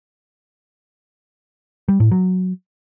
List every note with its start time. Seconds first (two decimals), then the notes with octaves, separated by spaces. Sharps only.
1.88 G3
2.00 A2
2.12 F#3